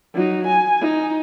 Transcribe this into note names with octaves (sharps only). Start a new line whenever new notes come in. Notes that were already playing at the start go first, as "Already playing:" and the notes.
F#3 D#4
G#5
D#4